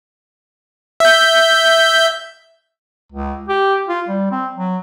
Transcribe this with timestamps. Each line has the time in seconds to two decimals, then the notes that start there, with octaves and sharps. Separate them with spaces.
1.00 E5 G6
3.12 C#2
3.49 G4
3.89 F4
4.08 G3
4.31 C4
4.55 F#3